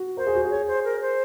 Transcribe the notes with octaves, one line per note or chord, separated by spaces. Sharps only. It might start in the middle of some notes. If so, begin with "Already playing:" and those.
Already playing: F#4
A#4 C5
G#4
F#4
G#4
C#5
C5
A#4
C5